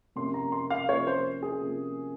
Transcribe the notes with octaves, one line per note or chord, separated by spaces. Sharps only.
C3 F3 A#3 C#4 F4 C6
A#5
C6
F5
C3 F3 A#3 C#4 F4 C#5
C5
G#4
C3 F3 A#3 C#4 F4